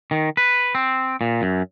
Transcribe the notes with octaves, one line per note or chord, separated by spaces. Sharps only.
D#3
B4
C4
A#2
F#2